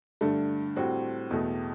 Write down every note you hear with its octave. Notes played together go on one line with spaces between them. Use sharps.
G2 D3 A3
A2 G3 C4 F#4
E2 B2 A3